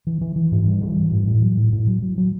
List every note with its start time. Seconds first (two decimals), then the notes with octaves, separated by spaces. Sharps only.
0.07 E3
0.21 E3
0.36 E3
0.52 G#2
0.67 G3
0.82 E3
0.96 E3
1.12 G#2
1.27 A2
1.42 F#3
1.57 A2
1.73 A2
1.87 F#3
2.02 F#3
2.18 F#3